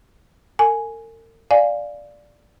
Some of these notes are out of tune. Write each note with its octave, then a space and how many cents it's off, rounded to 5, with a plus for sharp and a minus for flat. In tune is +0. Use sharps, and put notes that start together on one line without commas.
A#4 -45 G#5 +5
D5 +0 F5 +0 G#5 +0